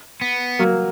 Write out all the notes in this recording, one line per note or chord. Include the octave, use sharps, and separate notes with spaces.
B3
F#3 A#3